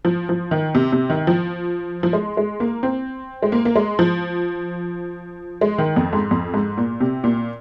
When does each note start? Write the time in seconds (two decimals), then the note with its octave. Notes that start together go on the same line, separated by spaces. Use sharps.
0.05 F3
0.29 F3
0.51 D#3
0.75 C3
0.92 C3
1.10 D#3
1.27 F3
2.03 F3
2.13 G#3
2.37 G#3
2.60 A#3
2.83 C4
3.42 G#3
3.52 A#3
3.65 A#3
3.76 G#3
3.99 F3
5.61 G#3
5.78 D#3
5.96 F2
6.13 G#2
6.31 F2
6.54 G#2
6.78 A#2
7.01 C3
7.24 A#2